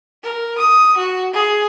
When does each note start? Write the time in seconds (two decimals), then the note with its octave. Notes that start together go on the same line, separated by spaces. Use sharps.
0.23 A#4
0.58 D#6
0.97 F#4
1.33 G#4